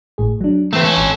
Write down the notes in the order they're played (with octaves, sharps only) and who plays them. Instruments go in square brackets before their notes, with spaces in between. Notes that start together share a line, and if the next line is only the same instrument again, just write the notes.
[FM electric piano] G#1 A2 G#4
F#3 D4
[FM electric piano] E3 B4 [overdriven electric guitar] A3 C4
[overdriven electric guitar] C#4 A4
[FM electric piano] G#1